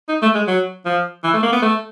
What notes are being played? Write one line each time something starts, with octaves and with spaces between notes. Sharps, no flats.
D#4
A3
G#3
F#3
F3
E3
A3
A#3
B3
A3